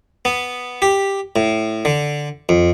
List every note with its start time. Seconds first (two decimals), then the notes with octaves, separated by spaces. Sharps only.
0.25 B3
0.82 G4
1.36 A2
1.85 D3
2.49 F2